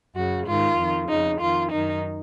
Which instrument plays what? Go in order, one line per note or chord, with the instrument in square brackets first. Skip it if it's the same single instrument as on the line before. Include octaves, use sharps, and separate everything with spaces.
[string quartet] F#2 C#3 F#4
G#2 D#3 F4
F2 D#3
F2 C#3 D#4
F2 D#3 F4
F#2 D#3 D#4